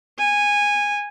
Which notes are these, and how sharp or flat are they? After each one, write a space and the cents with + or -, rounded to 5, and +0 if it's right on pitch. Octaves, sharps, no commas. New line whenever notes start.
G#5 -15